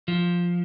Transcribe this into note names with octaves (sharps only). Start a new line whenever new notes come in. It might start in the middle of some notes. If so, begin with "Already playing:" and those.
F3